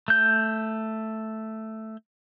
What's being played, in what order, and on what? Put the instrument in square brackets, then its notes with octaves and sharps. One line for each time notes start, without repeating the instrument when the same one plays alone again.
[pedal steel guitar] A3 G6